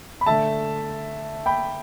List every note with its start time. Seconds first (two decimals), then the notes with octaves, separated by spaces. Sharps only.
0.21 B5
0.26 D3 A3 E5 A5
1.46 G5 B5